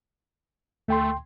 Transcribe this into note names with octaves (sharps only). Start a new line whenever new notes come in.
D2 A3 G5 C6